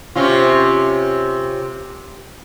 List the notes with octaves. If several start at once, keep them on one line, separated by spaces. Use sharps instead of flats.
C3 C#4 F4